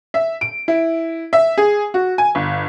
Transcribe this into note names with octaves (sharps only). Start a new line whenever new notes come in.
E5
D7
E4
E5
G#4
F#4
G#5
G1